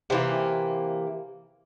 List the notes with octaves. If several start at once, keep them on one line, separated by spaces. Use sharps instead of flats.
C3 E3 A#3